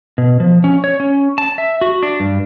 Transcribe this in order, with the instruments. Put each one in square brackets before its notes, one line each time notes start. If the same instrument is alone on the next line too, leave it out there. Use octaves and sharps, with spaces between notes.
[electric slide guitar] B2
F3
C#4
C#5
C#4
A5
E5
F#4
D4
G2